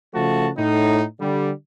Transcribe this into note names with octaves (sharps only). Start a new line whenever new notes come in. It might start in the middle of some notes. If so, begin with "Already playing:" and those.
C#3 F3 A3 F#4 A5
A2 D#4
D3 G3